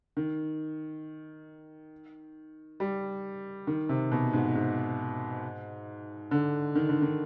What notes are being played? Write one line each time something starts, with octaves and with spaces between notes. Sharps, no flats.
D#3
G3
D#3
C3
B2
G#2
G#2
D3
D#3
D3
D#3